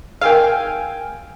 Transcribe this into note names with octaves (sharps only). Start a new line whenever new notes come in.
G#4 A#4 F5 G5 G#5 E6